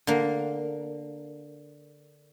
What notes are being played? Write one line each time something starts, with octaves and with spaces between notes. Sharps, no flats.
D3 A#3